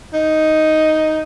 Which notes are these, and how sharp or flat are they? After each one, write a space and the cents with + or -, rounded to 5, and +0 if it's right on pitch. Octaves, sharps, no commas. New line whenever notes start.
D#4 +5